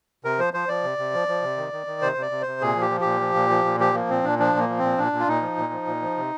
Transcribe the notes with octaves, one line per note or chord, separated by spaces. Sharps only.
C3 A#4
F3 C5
F3 C5
F3 D5
C3
C3
F3
F3
C3
D#3
D#3
D#3
C3 C5
C3 D5
C3
C5
C3
A#2 G#4
F3
G4
F3
A#2 G4
F3
A#2
F3
A#2
F3 G4
F3 A#3
A#2 C4
A#2 D4
F3 D4
A#2
A#3
F3
A#2 C4
A#2 D4
A#2
F4
A#2 D#4
F3
A#2
F3
A#2
F3
C3